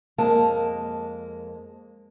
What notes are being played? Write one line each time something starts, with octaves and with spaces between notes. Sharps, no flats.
F2 G#3 A#3 A5